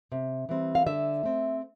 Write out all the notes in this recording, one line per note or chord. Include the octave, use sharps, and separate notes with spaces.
C3
E3 G3 C4
F5
D3 E5
A3 C4